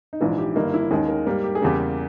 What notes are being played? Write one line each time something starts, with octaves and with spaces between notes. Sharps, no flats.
D#4
A#1 G#2 E3 E4
G4
G1 G2 D#3 A#3 D#4
E4
D#2 D#3 G#3 C#4 G#4
A#4
G#2 G3 A#3 A#4
G4
G#4
E2 C#3 G3 A#3 G4